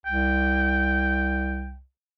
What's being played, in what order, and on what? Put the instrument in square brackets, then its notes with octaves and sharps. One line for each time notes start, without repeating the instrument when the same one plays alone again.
[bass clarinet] C2 [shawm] G5